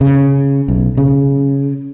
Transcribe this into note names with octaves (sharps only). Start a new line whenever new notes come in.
C#3
B1
C#3